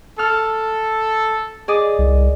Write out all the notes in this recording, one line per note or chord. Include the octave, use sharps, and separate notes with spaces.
A4 F6
G#4 D5 D#5
C2